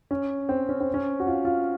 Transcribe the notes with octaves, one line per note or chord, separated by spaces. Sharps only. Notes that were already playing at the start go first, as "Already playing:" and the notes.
C#4
C4
C#4
C4
C#4
F#4
F4
F4